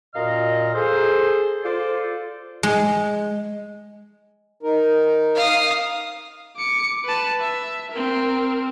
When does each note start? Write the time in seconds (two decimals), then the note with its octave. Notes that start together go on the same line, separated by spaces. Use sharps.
0.15 F#2 A#2 D#5 F5 A#5 F6
0.74 G#4 A4 C5
1.64 F4 A4 C5 D5
2.63 G#3
4.63 D#4 A#4
5.35 F5 D#6
6.57 D6 C#7
7.05 B4 A5
7.41 E5
7.92 C4 A#4